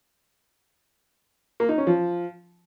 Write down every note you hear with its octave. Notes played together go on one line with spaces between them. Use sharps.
A#3
D#4
C#4
F3